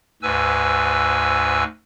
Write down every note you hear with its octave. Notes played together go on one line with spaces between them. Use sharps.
D2 G#2 B4 G#5 E6